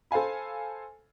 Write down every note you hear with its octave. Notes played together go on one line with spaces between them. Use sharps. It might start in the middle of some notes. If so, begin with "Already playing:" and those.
A4 C5 F5 G#5 B5